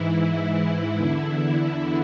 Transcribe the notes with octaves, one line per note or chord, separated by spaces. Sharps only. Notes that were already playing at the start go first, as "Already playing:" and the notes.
Already playing: G#2 E3 E4
E2 D3 E4